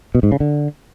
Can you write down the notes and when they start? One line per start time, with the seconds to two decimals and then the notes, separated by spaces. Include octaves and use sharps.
0.15 B2
0.23 G#2
0.32 C#3
0.40 D3